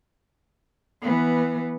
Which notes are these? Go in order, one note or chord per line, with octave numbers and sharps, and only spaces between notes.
E3 B3